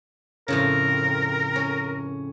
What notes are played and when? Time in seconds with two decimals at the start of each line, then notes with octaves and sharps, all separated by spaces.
0.48 F2 A2 C#3 A#4
1.56 C#4